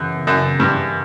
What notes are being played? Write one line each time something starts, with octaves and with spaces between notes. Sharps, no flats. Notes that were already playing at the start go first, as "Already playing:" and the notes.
Already playing: F#2 C#3 E3 B3
F#2
G2